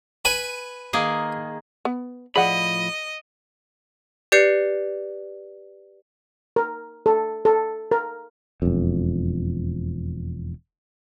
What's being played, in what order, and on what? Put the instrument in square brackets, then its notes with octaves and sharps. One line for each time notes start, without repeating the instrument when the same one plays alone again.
[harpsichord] B4 G#5 B5
[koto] D#3 A#3 G#4
[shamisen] B3
[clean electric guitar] A2 F3 B5 [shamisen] G#4 D5 F#5 [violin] D#5
[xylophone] G4 B4 D5 G6 C7 C#7
[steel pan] A#4
A4
A4
A#4
[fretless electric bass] E1 F2